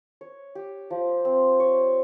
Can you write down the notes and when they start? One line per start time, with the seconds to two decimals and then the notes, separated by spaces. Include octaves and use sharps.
0.21 C#5
0.55 G4
0.90 F3
1.25 C4
1.60 C#5